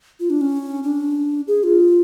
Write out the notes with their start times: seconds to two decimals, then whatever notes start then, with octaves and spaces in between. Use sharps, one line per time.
0.20 F4
0.30 D4
0.41 C#4
0.83 D4
1.48 G#4
1.64 F4